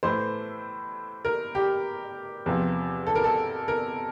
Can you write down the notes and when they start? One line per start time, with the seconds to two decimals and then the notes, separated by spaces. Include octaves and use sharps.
0.03 A2 E3 A3 C5
1.25 A#4
1.55 G4
2.46 E2 C3 F3
3.07 A4
3.15 A#4
3.24 A4
3.68 A#4